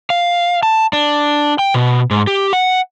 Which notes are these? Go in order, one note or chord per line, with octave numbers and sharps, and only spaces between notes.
F5
A5
D4
G5
B2
G#2
G4
F#5